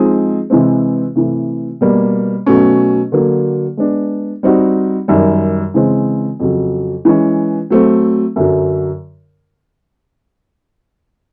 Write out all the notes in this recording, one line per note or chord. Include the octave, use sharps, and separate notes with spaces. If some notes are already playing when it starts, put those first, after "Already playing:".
Already playing: F3 G#3 C4 D#4 G#4
C3 E3 G#3 C4
C3 E3 A3
B2 G3 A#3
B2 F#3 A3 C#4
D3 F#3 A#3
G#3 B3 D4
G3 C4 D#4 F#4
F#2 D#3 G3
C#3 E3 G#3 C4
F2 C#3 F#3
E3 G#3 C#4
F#3 A3 C4
F#2 D3 F#3